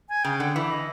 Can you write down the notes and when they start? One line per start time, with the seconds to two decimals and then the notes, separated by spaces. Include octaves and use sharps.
0.09 G#5
0.24 C#3 G5
0.40 D3 F#5
0.56 E3 E5
0.71 D#5